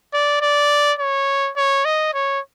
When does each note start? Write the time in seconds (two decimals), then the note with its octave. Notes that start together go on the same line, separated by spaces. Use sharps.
0.14 D5
0.41 D5
0.99 C#5
1.56 C#5
1.85 D#5
2.14 C#5